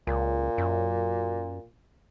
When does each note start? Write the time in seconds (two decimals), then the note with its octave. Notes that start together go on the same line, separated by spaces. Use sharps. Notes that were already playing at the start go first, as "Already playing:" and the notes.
0.07 C#2 A#2
0.58 F#2